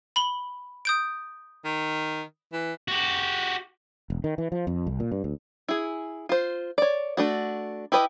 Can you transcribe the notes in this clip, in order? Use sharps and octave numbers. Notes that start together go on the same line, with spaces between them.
B5 F#7 G7
D#6 G6 D7
D#3
E3
F#4 G4
E1
D#3
E3
F3
F2
C2
A#2
G2
D2
E4 G#4
F4 C5
C#5 D5
A3 D4 F#4
E4 G4 B4 C5 D#5